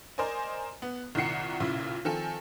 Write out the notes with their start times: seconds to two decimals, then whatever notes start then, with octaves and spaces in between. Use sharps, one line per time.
0.18 A#4 C5 D5 D#5 G#5
0.82 B3
1.15 C2 A#2 D#3 F#5 C7 C#7
1.60 B1 A#2 C#3 E4
2.05 D#3 F3 C4 A4 G#5